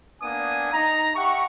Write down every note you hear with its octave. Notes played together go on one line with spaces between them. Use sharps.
A#3 B3 D4 G#5 D#6
D#4 A#5
G4 E5 F#5 C#6